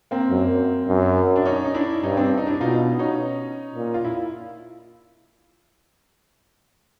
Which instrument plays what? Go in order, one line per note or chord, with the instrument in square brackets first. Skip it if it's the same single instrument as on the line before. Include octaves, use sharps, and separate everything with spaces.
[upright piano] A#3 C4
[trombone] F#2
F#2
[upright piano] D4
C#4 D#4
D#4
D4 E4
[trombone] G2 [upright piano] C#4 D#4
[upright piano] C4 D4
D#4
D4 E4
[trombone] B2 [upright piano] D#4 F4
[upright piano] C#4 D#4
[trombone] A#2
[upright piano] F4
E4